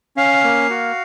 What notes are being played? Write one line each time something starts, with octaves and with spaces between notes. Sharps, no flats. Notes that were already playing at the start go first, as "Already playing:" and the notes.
C#4 F5
A#3
F#4